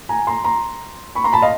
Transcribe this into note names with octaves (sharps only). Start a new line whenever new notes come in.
G#5 A#5
A#5 C6
A#5 C6
B5 C#6
A#5 C6
A5 B5
D#5 F5